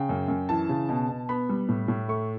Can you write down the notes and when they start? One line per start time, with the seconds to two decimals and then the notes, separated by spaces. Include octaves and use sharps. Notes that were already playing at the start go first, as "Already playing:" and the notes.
Already playing: C#3 G5
0.09 F#2
0.28 F#2
0.49 E3 A5
0.69 C#3
0.89 B2
1.09 B2
1.29 B3 B5
1.49 G3
1.69 A2
1.88 A2
2.08 A3 C#6